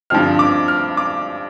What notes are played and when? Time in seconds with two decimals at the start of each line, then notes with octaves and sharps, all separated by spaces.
0.10 G2 D3 F3 C4 F6
0.39 D6
0.68 F6
0.97 D6